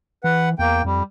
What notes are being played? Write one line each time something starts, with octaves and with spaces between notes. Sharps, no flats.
E3 B4 F#5
E2 A#3 G5
F2 G3